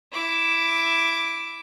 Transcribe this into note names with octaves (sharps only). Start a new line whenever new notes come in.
E4 D6